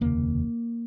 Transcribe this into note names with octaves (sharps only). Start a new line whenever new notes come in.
F1 D#2 C#3 A#3